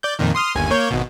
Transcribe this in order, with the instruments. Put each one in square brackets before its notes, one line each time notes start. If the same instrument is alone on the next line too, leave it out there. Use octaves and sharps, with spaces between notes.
[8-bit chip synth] D5 G6
F2 A#2 D#3
C6 D#6 F6
G1 D#2 G#5
A#3 C#5 G6
G#1 B2